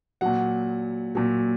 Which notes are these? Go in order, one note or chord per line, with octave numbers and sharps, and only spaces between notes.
A#2 F#3 F#5
A#2 F#3